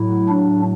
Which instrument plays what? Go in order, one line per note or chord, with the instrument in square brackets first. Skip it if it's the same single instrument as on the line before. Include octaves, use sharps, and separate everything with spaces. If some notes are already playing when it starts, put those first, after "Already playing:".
Already playing: [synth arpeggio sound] A2 F#3 [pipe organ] E4
[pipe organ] D4